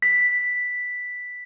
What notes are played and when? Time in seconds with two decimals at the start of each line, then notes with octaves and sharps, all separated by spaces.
0.02 B6